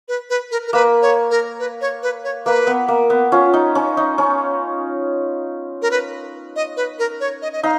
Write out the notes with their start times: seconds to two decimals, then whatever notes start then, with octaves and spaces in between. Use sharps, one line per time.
0.08 B4
0.30 B4
0.51 A#4
0.67 A#4
0.73 A#3 B4
1.02 C#5
1.31 A#4
1.59 B4
1.81 C#5
2.03 B4
2.24 C#5
2.45 A#3 B4
2.67 B3
2.88 A#3
3.10 B3
3.32 C#4 F4
3.53 D#4
3.75 C#4
3.97 D#4
4.18 C#4
5.82 A#4
5.91 B4
6.56 D#5
6.77 B4
6.99 A#4
7.20 C#5
7.42 D#5
7.53 D#5
7.63 D#4 F5